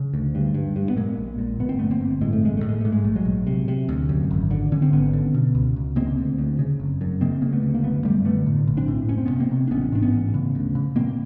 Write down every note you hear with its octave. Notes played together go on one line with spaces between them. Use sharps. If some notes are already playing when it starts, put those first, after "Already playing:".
Already playing: C#3
D2
G2
G2
G2
B3
A#2 G#3 A#3
A#1
A#2
G1 B3
C4
G1 A3 B3
A#3 C4
G1
A2 G#3
A3
A1 G#3
A3
A2
G#3
G#2 A3
G#3
A#1 A3
F#3 G#3
A#1
C3
C3
D2
F#2
G#1
D3
D3 C#4
C4
G#1 B3 C#4
D3
B2
C#2
C#2
C#3 A#3 C4
D2
D2
C#3
F#1
F#2
C#3 A#3 C4
C#3 A#3
A3 B3
D2
A#3
F#1 A3 B3
F#2 G3 A3
D3 A3 B3
A2
A#1
C4 D4
A2
F#1 C#4
C4
C3 B3 C#4
A#3 C4
C3
D4
A1 B3 C#4
G#2 D4
B3 C#4
A1
C#3
D2
C#3
A#2 A#3 C4